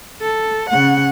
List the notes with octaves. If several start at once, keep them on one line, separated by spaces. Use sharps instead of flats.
A4
C#3 F#5